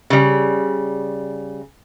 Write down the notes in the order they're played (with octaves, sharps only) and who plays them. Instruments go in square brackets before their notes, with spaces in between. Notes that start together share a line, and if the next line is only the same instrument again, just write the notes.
[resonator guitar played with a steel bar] C#3 G3